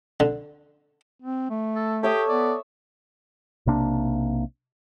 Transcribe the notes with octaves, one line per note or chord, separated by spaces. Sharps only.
D3
C4
A3
A4
G4 A4 C#5 E5 D#6
B3 D5
B1 C3 A#3 D4